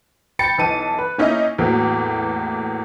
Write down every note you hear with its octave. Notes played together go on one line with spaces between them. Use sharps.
G5 B5 A6 C#7
B1 E3 A5 D#7
B4
A#3 C#4 D#4 E4
E2 A2 E3 F#3 A#3